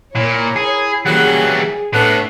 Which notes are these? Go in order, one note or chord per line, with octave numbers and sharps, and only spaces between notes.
A#2 E4 A#4 C#5
G#4
C#3 E3 F#3 G3 A#3 G#4 F#5
A2 A3 B3 D4 A4